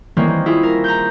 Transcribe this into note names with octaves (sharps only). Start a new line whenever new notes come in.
D#3 E3 G3 A#3 C4 C#4
A#3
E4 F4 G#4
A#4
A#5 G6